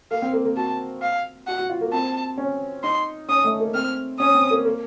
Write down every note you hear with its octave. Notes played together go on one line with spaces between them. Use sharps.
A#3 F5
C4
A#3
A#3
F#4 A5
F5
F#4 F#5
F#4
F4
A#3
C4 A5
C#4
D#4 C6
C#4 D#6
A3
A#3
C4 F6
C#4 D#6
C4
A#3
A#3